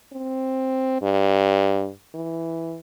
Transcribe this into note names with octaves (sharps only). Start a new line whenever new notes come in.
C4
G2
E3